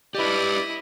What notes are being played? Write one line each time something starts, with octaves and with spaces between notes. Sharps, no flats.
E4 G4 B4 D5 D#5